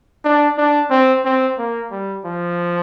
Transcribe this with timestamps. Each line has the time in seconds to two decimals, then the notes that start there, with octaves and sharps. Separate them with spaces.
0.25 D4
0.58 D4
0.91 C4
1.25 C4
1.58 A#3
1.91 G3
2.26 F3